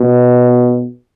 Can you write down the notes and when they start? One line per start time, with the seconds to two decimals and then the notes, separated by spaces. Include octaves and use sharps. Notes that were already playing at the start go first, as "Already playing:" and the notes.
Already playing: B2